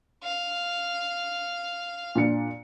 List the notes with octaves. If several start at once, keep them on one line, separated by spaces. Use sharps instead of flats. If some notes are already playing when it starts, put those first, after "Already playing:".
F5
A#2 D4 C#7